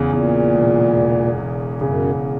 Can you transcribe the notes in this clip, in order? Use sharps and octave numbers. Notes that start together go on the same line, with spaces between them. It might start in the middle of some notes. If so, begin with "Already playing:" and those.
Already playing: E2 C#3
E2 A#2
E1
E1
E1
F#2 C#3